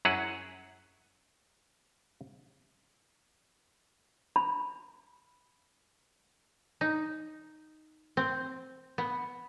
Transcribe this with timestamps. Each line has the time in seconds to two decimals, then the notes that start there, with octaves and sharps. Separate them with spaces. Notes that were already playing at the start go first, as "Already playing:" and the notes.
0.05 F#2 F#3 E4 G#4 F#5
4.36 B5
6.81 D#4
8.17 C4
8.98 B3